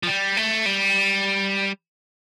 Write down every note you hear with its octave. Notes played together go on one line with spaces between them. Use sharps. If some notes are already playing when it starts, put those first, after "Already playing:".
F3
G3
A3
G3